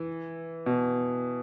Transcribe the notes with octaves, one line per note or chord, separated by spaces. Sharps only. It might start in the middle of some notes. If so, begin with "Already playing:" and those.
Already playing: E3
B2